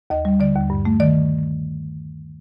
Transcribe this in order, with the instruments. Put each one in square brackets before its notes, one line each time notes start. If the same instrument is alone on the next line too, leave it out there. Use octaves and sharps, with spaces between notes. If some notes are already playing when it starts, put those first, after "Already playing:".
[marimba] D#2 D#5
G3
D3 D5
D#2
G2
A3
D#3 D5